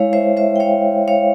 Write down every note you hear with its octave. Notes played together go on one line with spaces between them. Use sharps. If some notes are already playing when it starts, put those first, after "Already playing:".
Already playing: G#3 E4 C#5 F5
C5 E5
C5 E5
G5
C#5 F5
C#5 F5